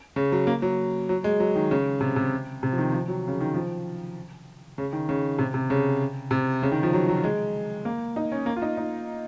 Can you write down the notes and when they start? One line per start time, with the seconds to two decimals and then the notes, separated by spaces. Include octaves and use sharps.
0.16 C#3
0.32 F#3
0.47 A#3
0.62 F#3
1.09 F#3
1.24 G#3
1.40 F#3
1.56 D#3
1.71 C#3
2.01 C3
2.16 C3
2.63 C3
2.72 F3
2.78 D#3
2.93 F3
3.08 F#3
3.28 C#3
3.40 D#3
3.54 F3
4.78 C#3
4.93 D#3
5.09 C#3
5.39 C3
5.54 C3
5.70 C#3
6.31 C3
6.63 C#3
6.72 D#3
6.83 F3
6.93 F#3
7.09 F#3
7.24 G#3
7.85 A#3
8.16 D#4
8.32 C#4
8.46 A#3
8.56 F4
8.62 D#4
8.77 D#4